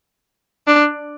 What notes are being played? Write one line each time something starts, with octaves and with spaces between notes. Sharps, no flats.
D4